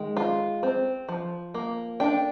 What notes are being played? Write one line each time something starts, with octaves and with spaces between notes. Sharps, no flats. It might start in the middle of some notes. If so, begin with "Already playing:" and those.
Already playing: D#3 G#3 G5
F4
C4
F3
A#3
D4 G5